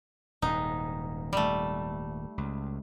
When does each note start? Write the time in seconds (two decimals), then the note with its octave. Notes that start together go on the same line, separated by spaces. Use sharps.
0.42 D#1 G#2 D#4
1.33 G3 A3
2.38 C#2